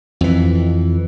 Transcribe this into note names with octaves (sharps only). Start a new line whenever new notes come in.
F2 E3